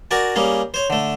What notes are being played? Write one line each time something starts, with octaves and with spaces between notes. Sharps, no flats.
F#4 A#4 D5 G#5
G3 A#3 C#4 G#4
C5 C#5
D3 A3